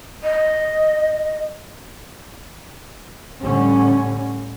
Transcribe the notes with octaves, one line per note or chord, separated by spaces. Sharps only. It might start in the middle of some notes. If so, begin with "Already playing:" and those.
D#5
A2 D3 G3 C#4